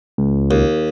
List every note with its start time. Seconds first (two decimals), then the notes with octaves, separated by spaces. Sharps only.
0.18 C#2
0.51 D#2